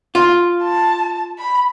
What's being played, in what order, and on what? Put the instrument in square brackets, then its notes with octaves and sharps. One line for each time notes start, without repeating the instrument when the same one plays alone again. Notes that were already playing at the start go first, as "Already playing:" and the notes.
[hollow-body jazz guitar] F4
[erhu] A5
B5